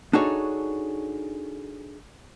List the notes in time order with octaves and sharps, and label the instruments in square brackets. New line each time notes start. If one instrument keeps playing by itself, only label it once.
[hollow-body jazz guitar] D4 D#4 F#4 G#4 A4 C#5